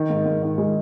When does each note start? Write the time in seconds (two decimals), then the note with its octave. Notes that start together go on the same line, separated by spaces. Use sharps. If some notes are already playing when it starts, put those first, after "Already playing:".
Already playing: D#3
0.10 G#2
0.26 G#2
0.43 D#3
0.58 G#3